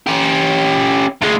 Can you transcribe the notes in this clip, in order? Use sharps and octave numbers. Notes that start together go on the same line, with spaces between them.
C#4 G4
D2 G#3